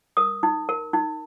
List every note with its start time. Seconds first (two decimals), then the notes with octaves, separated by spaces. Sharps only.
0.17 A#4 D#6
0.43 D#4
0.69 A#4
0.93 D#4